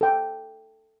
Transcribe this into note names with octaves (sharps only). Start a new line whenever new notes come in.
A4 G5